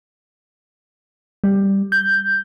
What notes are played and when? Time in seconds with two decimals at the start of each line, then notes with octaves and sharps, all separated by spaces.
1.44 G3
1.92 G6